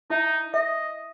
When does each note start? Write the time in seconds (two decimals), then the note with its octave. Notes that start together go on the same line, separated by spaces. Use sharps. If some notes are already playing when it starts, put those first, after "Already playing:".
0.10 D#4 E4 E5
0.54 D#5 E5